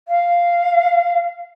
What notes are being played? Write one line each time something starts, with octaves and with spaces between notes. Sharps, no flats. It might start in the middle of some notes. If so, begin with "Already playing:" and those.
F5